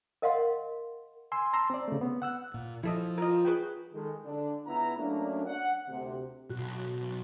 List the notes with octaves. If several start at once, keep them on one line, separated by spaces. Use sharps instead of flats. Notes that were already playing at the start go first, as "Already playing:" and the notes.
A#4 D#5 F5 F#5 C6
G#5 C6 E6
A5 A#5 C6 E6
C4 D5
C#3 A3
B3
F#5 E6 F#6
A#2
F3 E4 A4 D#5
F4 A#4 D#5
G#4 B4 G5
D#3 G#3 A4
D3 D4
C#2 B3 E4 A#5
F#3 A3 A#3 C#4 D4
F#5
D2 C3
B1 F#4